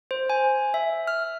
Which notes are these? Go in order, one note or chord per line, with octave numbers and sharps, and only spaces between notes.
C5
G#5
E5
F6